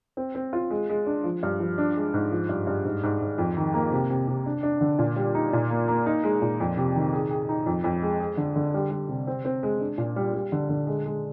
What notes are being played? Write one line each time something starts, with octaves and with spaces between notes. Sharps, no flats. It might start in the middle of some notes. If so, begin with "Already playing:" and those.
C4
C4
F4
G#3
G#3
D4
F3
G2
F3
D4
G#3
G#2
F3
G2
G2
G#2
G#2
G#2
F2
D#3
A#3
C3
C3
C3
D4
D4
D3
A#2
G3
D#4
A#2
A#3
A#3
D#4
G#3
A#2
F2
C3
D#3
G#4
G#4
D#4
F2
F2
G#3
G#4
D3
D3
G3
G3
C3
C4
C4
G#3
D4
A#2
G3
G3
D3
D3
G#3
G#3